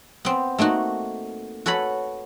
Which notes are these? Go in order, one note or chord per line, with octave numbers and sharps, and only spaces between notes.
B3 C4
A3 A#3 D#4 F#4
F#4 A4 B4 C#5 B5